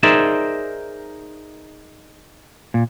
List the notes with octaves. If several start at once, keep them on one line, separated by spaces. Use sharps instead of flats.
D#4 G#4 A#4 C5 D5 E5
A#2